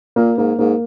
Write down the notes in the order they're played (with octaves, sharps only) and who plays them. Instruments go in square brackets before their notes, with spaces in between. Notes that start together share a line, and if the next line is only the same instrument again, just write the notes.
[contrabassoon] A#2 [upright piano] A#3
[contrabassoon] G#2 [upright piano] A#3
[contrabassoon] G#2 [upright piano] A#3